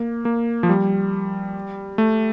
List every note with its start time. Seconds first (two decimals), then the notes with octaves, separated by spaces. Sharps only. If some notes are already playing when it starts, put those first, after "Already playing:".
Already playing: A#3
0.25 A#3
0.63 F3
0.69 G3
1.98 A3